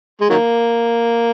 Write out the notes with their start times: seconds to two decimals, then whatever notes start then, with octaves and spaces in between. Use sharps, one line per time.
0.21 G#3
0.30 D#3 F#3 A#3